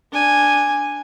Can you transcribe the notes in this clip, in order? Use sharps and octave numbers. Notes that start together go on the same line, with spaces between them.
D4 G#5